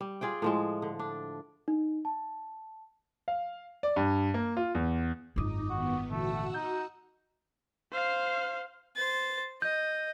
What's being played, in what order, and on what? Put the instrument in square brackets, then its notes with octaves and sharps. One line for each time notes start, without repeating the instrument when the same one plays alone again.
[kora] G3
F4 G#4 D5 G5
A2 F3 G#3
D3
D4
[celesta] D#4
A5
[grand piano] F5
D5
G2
A#3
F4
E2
[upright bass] G#1 F4 [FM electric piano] F#2 D6 D#6 [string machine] D#4
[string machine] D#3 B3 [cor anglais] F#4
[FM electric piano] A#2 D3 E3 [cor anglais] A3 [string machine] F#4 F#5 E6
[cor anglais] D#4 [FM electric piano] G6
[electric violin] C5 F5
[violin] C5 A6
[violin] D#5 [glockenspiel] G6